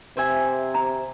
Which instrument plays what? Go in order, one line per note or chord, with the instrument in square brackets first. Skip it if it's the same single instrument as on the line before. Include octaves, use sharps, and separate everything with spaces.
[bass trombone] C3 [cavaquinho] C5 E5 G#5
[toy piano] A#5